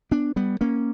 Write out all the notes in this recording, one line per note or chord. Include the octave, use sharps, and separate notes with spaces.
B3 D4
G3 B3
A#3 C#4